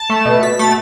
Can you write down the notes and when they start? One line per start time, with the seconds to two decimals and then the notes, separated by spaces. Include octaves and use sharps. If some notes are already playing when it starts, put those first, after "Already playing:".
Already playing: A5
0.10 A3
0.26 B2
0.43 B2 B6
0.59 A3 A6